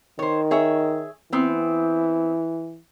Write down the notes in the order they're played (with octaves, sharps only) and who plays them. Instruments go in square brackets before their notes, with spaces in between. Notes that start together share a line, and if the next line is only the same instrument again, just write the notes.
[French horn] D#3 [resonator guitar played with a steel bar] C5 C#5
[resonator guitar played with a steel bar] G#4 C#5 E5
[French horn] E3 [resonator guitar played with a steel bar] B3 C4